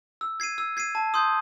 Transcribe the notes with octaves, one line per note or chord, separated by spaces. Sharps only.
E6
G#6 C7 D#7
E6
G#6 C7 D#7
A5
C6 D#6 G6